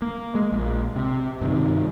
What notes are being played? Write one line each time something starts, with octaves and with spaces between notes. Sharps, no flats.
A#3
G#3
A#1
C3
G2 C3 D#3